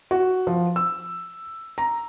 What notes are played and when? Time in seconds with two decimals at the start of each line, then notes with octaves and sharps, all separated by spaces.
0.11 F#4
0.47 F3
0.76 E6
1.78 A#5